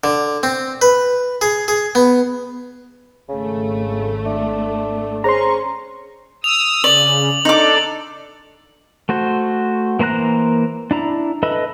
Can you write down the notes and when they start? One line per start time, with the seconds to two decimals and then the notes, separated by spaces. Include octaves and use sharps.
0.04 D3
0.43 C4
0.82 B4
1.41 G#4
1.68 G#4
1.95 B3
3.29 G#1 C#3 A3
4.25 D4 E5
5.24 C#4 G#4 C5 C#5 A#5 C6 C#6
6.44 D#6 E6 F7
6.84 C#3 D5 F#7
7.45 D4 D#4 A4 D5 D6
9.09 A3 F#4 C5
9.99 E3 A#3 C5 A#5 F#6
10.91 D4 E4 A#5
11.43 A4 B4 D#5 E5 B5